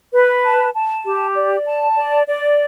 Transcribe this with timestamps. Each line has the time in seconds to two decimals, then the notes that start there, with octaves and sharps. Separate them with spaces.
0.14 B4
0.44 A5
0.74 A5
1.04 G4
1.35 D5
1.65 A5
1.96 D5
2.26 D5